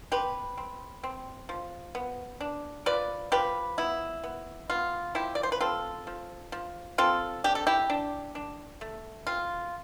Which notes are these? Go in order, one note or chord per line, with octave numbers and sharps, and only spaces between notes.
C4 G4 B4
C4
C4
F3
B3
D4
F3 B4 D5
F3 G4 B4
B3 E4
B3
B3 F4
F3 E4 G4
D5
C5
B4
C4 F4 A4
F3
F3
C4 F4 A4
D4 G4
A4
E4 G4
D4
D4
A3
C4 F4